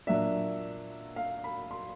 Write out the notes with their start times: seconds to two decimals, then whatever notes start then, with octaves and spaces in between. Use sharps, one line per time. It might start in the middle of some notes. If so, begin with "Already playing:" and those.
0.07 A#2 F#3 A#3 D4 E5
1.16 F5
1.44 B5
1.71 C6